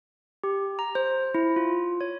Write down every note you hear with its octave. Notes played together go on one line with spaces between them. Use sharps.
G4
A#5
C5
E4
F4
C#5